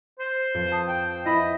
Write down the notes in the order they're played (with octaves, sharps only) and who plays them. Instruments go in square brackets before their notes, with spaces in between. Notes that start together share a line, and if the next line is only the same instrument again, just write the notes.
[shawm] C5
[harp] F2
A5 D#6
[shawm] G5
[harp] E4 E5 B5 [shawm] D#5